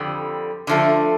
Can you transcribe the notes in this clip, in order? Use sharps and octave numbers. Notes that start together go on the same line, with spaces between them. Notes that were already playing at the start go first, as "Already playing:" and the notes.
Already playing: F2 D3 G3
D3 F3 A3